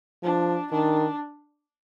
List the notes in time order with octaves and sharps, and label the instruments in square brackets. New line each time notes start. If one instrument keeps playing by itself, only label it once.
[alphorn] F3 [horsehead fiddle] D4
[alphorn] D#3 [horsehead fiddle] D4